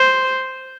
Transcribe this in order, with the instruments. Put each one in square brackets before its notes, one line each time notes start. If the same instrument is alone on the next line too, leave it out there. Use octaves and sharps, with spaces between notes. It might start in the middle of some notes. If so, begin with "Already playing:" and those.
Already playing: [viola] C5